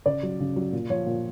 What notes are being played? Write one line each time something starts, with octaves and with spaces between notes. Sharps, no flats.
C#3 D5
F#3
C#3
F#3
A#2
F3 C#5
A#2